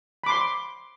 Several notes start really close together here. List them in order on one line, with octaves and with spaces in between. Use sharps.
B5 D6 C6